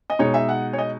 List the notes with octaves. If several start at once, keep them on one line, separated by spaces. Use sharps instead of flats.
D#5
B2 G#3 D#4 C#5
E5
F#5
C#5
D#5